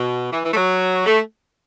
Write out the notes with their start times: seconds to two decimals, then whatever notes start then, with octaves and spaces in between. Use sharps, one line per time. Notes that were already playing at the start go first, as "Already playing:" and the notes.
Already playing: B2
0.31 E3
0.43 E3
0.51 A3
0.56 F#3
1.06 A3